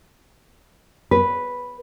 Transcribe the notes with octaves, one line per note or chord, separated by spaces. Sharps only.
B4